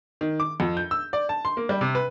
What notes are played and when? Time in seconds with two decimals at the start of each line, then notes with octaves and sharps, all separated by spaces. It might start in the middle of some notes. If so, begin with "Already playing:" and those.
0.21 D#3
0.40 D6
0.60 F2
0.77 G6
0.91 E6
1.13 D5
1.29 A5
1.45 C6
1.57 A#3
1.69 G3
1.81 C3
1.95 B4